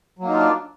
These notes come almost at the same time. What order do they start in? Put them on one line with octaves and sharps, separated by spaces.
F#3 A#3 D#4 F4 D4